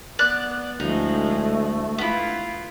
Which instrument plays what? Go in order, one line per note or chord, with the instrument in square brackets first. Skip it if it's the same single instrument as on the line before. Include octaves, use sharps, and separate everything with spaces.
[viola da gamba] B3 [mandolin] D5 F#6
[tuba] D2 [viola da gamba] F3 G#3 E4 [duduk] A3 [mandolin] D#4
[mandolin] B3 E4 [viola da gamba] F4